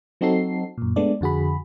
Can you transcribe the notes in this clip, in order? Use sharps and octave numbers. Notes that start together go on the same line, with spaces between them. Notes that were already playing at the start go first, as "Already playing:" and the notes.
F#3 C4 D#4 F#4 A4 C7
F#2 A#2
G#3 A3 B3 D4 D5
F2 D3 F#4 G#4 B5